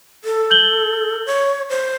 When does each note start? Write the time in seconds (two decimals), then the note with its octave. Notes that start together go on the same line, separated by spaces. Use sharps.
0.24 A4
0.50 G6 F#7 G7
1.26 C#5
1.70 C5